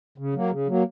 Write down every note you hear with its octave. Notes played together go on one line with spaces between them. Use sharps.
C#3
F#3 A#3
C#3
F#3 A#3